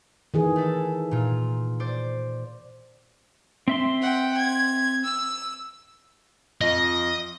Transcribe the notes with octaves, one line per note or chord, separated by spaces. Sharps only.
D#3 E3 G#4
A3 A4
A#2 F4
C5 D5
C4 E5 C6
F#5 G5
G#6
E6
F2 D#5